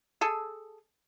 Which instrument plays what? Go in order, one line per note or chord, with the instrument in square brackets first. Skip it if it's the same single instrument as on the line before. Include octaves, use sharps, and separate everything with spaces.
[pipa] G#4 A4